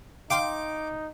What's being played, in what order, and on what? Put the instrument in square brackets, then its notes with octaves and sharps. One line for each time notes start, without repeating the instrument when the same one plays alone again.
[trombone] D#4 [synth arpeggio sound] F5 G5 C6 [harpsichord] D6